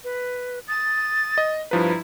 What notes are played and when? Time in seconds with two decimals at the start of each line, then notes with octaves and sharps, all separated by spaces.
0.04 B4
0.68 D#6 A6
1.38 D#5
1.71 G2 F3 E4 B4 A#5